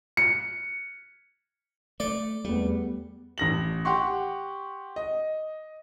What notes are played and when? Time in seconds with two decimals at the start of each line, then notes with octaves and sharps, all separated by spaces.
0.17 C#7
2.00 A3 D5
2.45 E2 G3 A3 B3
3.38 A1 A#6 F#7
3.85 G4 F#5 C6 C#6
4.96 D#5